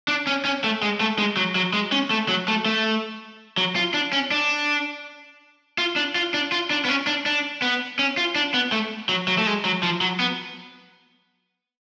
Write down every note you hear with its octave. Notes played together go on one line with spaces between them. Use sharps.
D4
C#4
C#4
A3
G#3
A3
G#3
F#3
F#3
G#3
C#4
A3
F#3
A3
A3
F#3
F4
D4
C#4
D4
F4
D4
F4
D4
F4
D4
B3
C#4
D4
D4
B3
C#4
F4
D4
B3
A3
F#3
F#3
A3
G#3
F#3
F3
F#3
B3